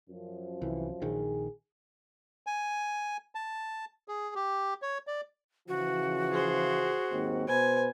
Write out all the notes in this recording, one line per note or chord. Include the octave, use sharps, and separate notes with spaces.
F#2 F3
C2 E3
A#1 D#3 G#4
G#5
A5
G#4
G4
C#5
D5
C#3 E3 F3 F#4
G#4 C5
D#2 G#2 C4
B2 B4 C5 G#5